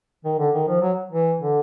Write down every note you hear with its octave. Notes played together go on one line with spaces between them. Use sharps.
D#3
D3
D#3
F3
F#3
E3
D3